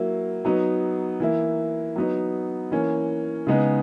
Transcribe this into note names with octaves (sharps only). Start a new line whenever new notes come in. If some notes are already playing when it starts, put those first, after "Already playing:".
Already playing: F#3 A#3 E4
F#3 B3 D#4
E3 A#3 E4
F#3 B3 D#4
E3 A#3 C#4
C#3 G#3 B3 D#4